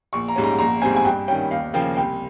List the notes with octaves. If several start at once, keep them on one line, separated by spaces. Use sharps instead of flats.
A#1 C#6
A#5
G#2 G3 C#4
A#5
A#1 A#5
G#2 G3 C4 G#5
G#5
G2 G5
D#3 G3 C#4 G5
D#2 F5
C#3 F3 A#3 G5
C2 G5